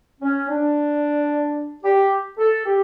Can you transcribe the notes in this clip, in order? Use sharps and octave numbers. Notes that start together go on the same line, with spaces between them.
C#4
D4
G4
A4
G4